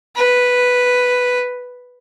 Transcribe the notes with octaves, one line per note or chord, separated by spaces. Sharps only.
B4